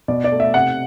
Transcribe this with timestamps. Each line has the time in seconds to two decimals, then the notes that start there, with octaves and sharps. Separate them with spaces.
0.08 B2 D5
0.24 D5
0.32 A3
0.40 E5
0.54 C3 F#5